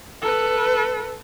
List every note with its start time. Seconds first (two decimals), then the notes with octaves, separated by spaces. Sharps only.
0.22 A4 B4